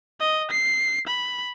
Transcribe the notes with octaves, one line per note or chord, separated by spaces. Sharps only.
D#5
C7
B5